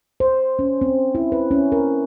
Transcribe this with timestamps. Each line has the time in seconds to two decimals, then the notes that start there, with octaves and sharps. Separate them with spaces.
0.20 C5
0.59 C#4
0.81 C4
1.15 E4
1.32 B4
1.51 C#4
1.72 A#4